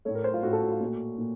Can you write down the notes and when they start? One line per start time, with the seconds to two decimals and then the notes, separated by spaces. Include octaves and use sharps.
0.05 A2 A3 C#5
0.15 A#4
0.24 C5
0.34 F4
0.43 A2 A3 F#4
0.53 A4
0.62 F#4
0.72 F4
0.80 A#2 A3 F#4
1.18 A#2